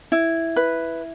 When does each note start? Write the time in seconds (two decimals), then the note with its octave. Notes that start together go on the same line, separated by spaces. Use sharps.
0.12 E4
0.56 B4